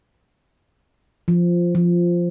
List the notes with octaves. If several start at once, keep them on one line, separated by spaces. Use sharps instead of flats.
F3
F3